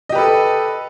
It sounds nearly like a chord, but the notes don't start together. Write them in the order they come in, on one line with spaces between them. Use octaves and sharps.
D#5 G4 B4 A4